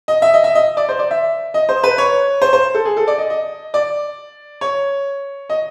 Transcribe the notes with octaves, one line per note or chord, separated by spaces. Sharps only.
D#5
E5
D#5
E5
D#5
D5
C5
D5
E5
D#5
C5
B4
C#5
C5
C5
A4
G#4
A4
D5
D#5
D#5
D5
C#5
D#5